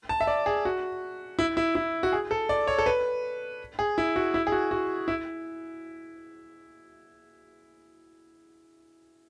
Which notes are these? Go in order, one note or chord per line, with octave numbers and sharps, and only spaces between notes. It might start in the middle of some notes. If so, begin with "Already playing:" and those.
A5
E5
D5
G#4
F#4
E4
E4
E4
F#4
G#4
A4
D5
C#5
A4
B4
G#4
E4
F#4
E4
G#4
F#4
F#4
E4